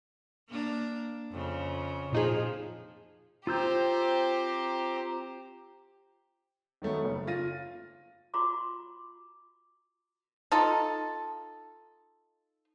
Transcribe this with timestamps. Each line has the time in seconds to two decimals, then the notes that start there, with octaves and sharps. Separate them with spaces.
0.48 A#3 D4
1.31 F2 C#3
2.12 A#2 F3 D#4 G#4
3.47 C4 F4 G4 C5 A#5 E6 G6
6.82 D#3 F#3 A3 B3
7.05 F#1
7.27 F4 A6 A#6 D#7
8.34 F4 F#4 A#5 C6 D6
10.52 D#4 F4 A4